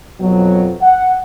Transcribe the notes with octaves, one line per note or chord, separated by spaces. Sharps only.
F2 B2 F#3
F#5